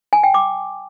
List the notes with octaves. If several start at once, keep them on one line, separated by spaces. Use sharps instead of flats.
G#5
G5
D6